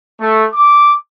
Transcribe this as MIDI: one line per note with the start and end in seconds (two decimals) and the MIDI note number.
0.21 0.45 57
0.54 0.91 86